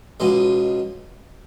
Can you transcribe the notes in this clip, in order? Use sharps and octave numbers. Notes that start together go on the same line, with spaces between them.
C#2 B2 G#3